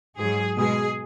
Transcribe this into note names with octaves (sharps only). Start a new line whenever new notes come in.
G#2 F#3 G#4
B2 G#3 G#4